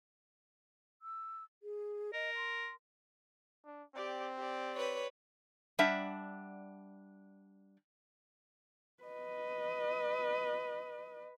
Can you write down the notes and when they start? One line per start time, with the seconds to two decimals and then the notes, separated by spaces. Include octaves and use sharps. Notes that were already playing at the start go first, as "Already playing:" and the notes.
1.02 E6
1.63 G#4
2.14 A#4 D#5
2.36 C6
3.65 D4
3.95 C4 G4 D5
4.37 G4 D5
4.75 B4 C#5
5.79 G3 D4 E5 F#5
9.03 B4 D#5